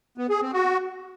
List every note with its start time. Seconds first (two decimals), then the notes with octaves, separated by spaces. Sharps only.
0.18 B3
0.29 G#4
0.41 C4
0.53 F#4